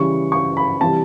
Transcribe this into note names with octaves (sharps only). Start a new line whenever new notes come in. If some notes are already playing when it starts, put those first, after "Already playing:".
Already playing: C#3 E3 G3 C#6
C#6
B5
C3 E3 G3 A5